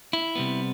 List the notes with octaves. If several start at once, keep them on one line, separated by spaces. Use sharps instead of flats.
E4
C3 G3 B3